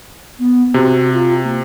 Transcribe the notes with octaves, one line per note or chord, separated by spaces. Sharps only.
B3
C3 F#4
F4
A#3